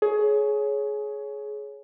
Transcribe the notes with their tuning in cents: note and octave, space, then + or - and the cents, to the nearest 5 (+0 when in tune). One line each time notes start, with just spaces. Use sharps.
G#4 +20 C#5 +0